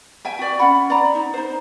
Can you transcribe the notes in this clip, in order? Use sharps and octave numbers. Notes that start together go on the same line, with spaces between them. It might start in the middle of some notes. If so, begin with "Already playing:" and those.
E5 G5 G#5
F#4 D5
C#4 F#5 B5
D5 A#5
D#4
D#4 C5